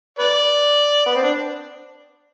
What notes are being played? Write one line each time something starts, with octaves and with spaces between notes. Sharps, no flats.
B4 D5
B3
C4
D4